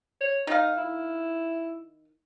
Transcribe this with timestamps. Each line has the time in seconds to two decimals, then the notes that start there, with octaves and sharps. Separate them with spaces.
0.21 C#5
0.47 D#3 D#4 F5
0.77 E4